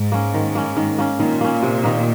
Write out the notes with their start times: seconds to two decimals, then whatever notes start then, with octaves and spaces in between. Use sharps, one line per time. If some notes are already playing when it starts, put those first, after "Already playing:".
Already playing: G#2
0.12 A#3 C#4
0.34 D#3
0.55 A#3 C#4
0.77 D#3
0.98 A#3 C#4
1.19 A#2 D#3
1.41 A#3 C#4
1.63 C3
1.84 D#3 A#3 D#4